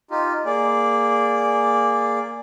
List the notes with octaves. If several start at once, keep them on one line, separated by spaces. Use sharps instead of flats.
D#4 F4 G4
A#3 G#4 D5